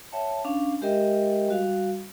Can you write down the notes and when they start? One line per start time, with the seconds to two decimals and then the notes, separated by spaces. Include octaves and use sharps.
0.12 C#5 E5 G5 A5
0.45 C#4 D4 F5
0.82 G#3 G4 A#4 D#5 E5 G5
1.49 G3 F#4 F5